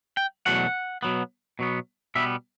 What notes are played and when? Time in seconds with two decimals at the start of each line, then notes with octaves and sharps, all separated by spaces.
0.17 G5
0.46 E2 B2 F#3 A3 F#5
1.03 B2 F#3 B3
1.59 B2 F#3 B3
2.15 B2 G3 B3 E5